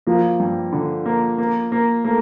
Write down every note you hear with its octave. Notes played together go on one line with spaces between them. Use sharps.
F3 A#3
G2
D3
A#3
A#3
A#3
A3 A#3